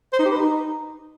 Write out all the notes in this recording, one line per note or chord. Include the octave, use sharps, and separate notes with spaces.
C5
D#4
G4
B4
D#4